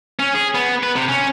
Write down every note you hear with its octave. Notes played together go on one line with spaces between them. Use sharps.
C#4
G#4
B3
B4
C3
C#4